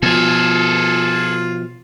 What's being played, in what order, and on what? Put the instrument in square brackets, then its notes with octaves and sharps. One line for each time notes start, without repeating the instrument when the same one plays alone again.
[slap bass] B2 F3 [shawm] F4 [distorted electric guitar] G#4 A4